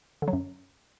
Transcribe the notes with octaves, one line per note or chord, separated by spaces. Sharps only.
D3
F#3
F#2